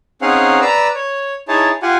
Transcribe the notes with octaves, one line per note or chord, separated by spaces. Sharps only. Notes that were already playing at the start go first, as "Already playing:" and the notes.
C4 C#4 D#4 G#4 F5 F#5
B4 D5 A#5 E6
C#5
D#4 E4 G#4 C#5 A5
F4 G4 F#5 G#5